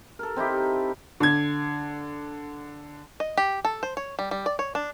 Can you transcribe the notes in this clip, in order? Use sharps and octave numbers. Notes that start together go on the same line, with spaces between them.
A4 A#4
C4 D#4 E4 G4
D3 G#6
D#5
G4
A4
C5
C#5
G3
G3
D5
C#5
D4